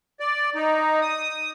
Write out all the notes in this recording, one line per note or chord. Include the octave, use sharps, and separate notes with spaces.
D5
D#4
D#6